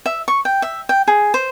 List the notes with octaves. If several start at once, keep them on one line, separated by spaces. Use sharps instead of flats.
E5
C#6
G5
E5
G5
G#4
C5